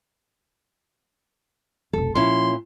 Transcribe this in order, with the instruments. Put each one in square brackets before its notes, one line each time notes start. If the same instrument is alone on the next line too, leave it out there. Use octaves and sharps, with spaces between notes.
[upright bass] F1 B1 [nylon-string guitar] A4
[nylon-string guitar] A#2 C#4 E4 [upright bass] F3 [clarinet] C6